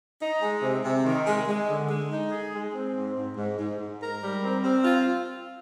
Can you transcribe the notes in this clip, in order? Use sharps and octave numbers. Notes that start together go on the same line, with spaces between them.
D#4
G#3
C3
C3
D#3
G#3
G#3
D3
G#3
D#4
G#4
G#3
C4
G#2
G#2
G#2
G#2
G#2
A#4
G3
C4
C4
F4